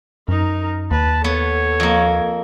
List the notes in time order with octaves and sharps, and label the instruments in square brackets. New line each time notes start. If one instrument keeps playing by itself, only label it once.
[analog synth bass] F#2 [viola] D#4 A#4
[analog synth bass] D#2 [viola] B4 [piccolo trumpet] A5
[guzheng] B3 [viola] A4 [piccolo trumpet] C#5
[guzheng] F2 A#3